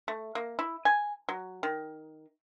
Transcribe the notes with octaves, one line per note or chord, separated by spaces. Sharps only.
A3
A#3
E4
G#5
F#3
D#3